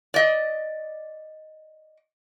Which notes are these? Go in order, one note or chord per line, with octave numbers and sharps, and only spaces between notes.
D5 D#5